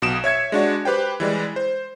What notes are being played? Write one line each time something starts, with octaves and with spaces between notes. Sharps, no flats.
B1 B2 D#6 D7 E7
C#5 E5 G#6 C#7
G#3 D4 F#4
G4 B4 C5 G5
E3 G3 G#3
C5